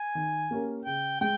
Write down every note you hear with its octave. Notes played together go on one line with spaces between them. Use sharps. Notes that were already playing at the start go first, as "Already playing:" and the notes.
Already playing: G#5
D#3
A#3 C#4 G4 A#4
C#3 G5
G#3 G5